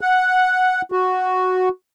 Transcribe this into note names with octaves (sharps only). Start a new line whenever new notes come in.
F#5
F#4